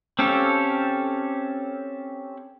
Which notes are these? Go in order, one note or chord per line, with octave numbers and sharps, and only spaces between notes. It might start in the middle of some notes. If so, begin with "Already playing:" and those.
C4 C#4 G4 A4 F5